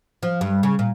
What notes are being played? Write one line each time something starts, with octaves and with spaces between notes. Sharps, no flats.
F3
G2
C#3
A#2